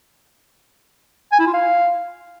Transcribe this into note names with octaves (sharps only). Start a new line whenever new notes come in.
G#5
E4
F4
F5